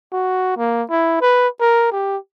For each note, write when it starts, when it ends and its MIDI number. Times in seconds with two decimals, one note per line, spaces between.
0.12 0.54 66
0.57 0.83 58
0.90 1.20 64
1.21 1.48 71
1.60 1.89 70
1.92 2.17 67